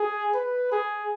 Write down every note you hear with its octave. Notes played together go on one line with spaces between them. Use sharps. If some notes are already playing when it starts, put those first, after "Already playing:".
Already playing: G#4
B4
G#4